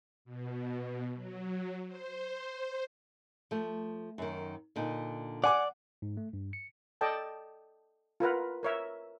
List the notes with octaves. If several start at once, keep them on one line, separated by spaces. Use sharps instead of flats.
B2
F#3
C5
F3 A3
F#2 D#3
A#2 D3 D#4
D5 F#5 G#5 D6
G#2
A3
G2
C#7
A4 D5 D#5 G5 A5
F4 A#4 B4 F#5
A#4 C#5 E5